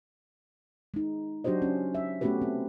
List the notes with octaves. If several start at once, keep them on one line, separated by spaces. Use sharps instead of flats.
G#3 D#4
F#3 D4 F#4 G4 C5 D#5
C#4
E5
A3 B3 C#4 F#4 G4 B4
C4